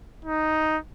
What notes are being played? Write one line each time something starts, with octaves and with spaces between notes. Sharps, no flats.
D#4